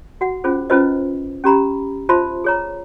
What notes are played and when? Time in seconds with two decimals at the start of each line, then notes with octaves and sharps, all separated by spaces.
0.21 F#4 F#5
0.44 C#4 F4 G#4 C5
0.70 C#4 E4 F4 B4 C5 D#5
1.44 C#4 G4 A#5 B5
2.09 F4 C5 E5 A5 B5 C6
2.44 G#4 C#5 A#5